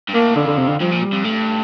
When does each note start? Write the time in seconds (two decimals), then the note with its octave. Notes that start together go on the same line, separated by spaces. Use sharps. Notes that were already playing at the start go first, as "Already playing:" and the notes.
0.09 G2
0.14 A2 A#3
0.36 F2 D3
0.47 D3
0.58 C3
0.69 D3
0.80 G2 F3
0.92 A#2
1.02 G3
1.13 F2
1.24 G2 A3